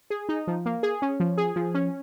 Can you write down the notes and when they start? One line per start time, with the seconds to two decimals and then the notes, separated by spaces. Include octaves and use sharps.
0.10 G#4
0.29 D#4
0.47 F3
0.66 A#3
0.83 G#4
1.02 C#4
1.20 F3
1.38 G#4
1.56 F3
1.74 C#4